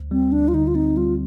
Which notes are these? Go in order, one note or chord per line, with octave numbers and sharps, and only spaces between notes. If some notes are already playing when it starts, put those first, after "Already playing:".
Already playing: D2
G3 C4
D2 D4
F4
D3 D#4
F4
C4 D#4
G3 F4